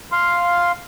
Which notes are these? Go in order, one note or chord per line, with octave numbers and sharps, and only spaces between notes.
F5 C6